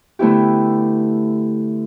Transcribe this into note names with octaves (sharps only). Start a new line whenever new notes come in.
D3 A3 B3 E4 G4